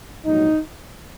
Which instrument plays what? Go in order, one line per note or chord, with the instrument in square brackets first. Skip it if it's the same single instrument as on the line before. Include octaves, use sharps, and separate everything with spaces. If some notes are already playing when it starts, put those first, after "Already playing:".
[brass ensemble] A#1 G#2 F#3 D#4